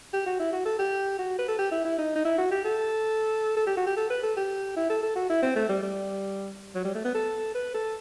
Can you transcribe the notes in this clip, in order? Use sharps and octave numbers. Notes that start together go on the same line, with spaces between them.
G4
F#4
E4
F#4
A4
G4
F#4
B4
A4
G4
E4
E4
D#4
D#4
E4
F#4
G4
A4
A4
G4
F#4
G4
A4
B4
A4
G4
E4
A4
A4
F#4
E4
C4
A3
G3
G3
F#3
G3
A3
B3
A4
B4
A4